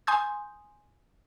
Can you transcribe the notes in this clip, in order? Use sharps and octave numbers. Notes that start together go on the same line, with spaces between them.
G#5 C6 D#6 G6